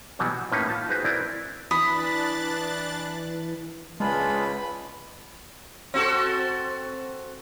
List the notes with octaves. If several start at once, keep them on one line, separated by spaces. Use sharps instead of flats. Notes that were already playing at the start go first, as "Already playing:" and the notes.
B2 E3 F#3 G3
F#4
A2 A#3 C#4 D#4 B4
F4 A5
D#4 F#4 G#4 B4 C5
C4 D4 E4 A#4 B4 D5
E3 D4 B5 D#6 F#6 A6
C#2 G#3 D4 F4 G#4 B4 B5
C4 F#4 A4